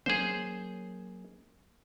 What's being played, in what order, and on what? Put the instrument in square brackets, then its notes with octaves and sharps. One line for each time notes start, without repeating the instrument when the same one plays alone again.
[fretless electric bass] F#3 A#3 C#4 [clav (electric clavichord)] G#4 C5